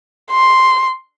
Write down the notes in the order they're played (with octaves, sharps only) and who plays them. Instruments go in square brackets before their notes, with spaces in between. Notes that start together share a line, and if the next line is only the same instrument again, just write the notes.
[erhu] C6